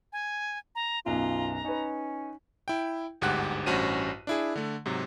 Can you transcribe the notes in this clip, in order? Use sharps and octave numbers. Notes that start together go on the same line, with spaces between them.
G#5
A#5
B1 F#2 F4 A#5
C#4 D#4 B4
E4 G5
G1 D2 G#2 G4 F#5 F#6
A1 G2 C#4 F#4 C5 D#7
D4 E4 G#4
D3 A3
G#2 C3 F#3